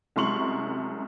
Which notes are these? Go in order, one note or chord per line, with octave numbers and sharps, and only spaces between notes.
C2 F#2 G#3 C6 C#6 F#7